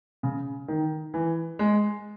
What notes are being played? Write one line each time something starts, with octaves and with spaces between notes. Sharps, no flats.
C#3
D#3
E3
G#3